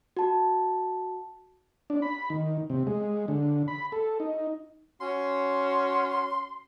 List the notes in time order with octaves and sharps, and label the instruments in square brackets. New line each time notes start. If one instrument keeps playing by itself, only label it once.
[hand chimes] F#4 A5
[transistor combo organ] D4
B5
D#3
C3
G#3
D3
B5
A4
D#4
[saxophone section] C#4 F#4 [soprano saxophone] C6